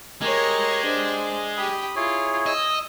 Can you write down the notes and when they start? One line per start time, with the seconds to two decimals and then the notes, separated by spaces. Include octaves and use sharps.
0.21 G#3 G4 A#4 C#5
0.85 D4 C5
1.57 G4 G5 B5 D#6
1.96 E4 F4 G#4 C#5
2.46 D#5 E6